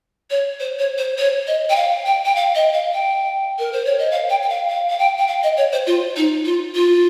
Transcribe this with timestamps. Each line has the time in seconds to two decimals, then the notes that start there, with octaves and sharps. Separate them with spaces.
0.30 C#5
0.60 C5
0.79 C#5
0.98 C5
1.18 C#5
1.47 D#5
1.70 G5
1.76 F5
2.06 G5
2.25 G5
2.36 F5
2.55 D#5
2.74 F5
2.94 G5
3.59 A#4
3.73 C5
3.85 C#5
3.99 D#5
4.11 F5
4.30 G5
4.43 G5
4.49 F5
4.70 F5
4.90 F5
4.99 G5
5.19 G5
5.28 F5
5.43 D#5
5.57 C#5
5.73 C5
5.87 F4
6.17 D#4
6.45 F4
6.75 F4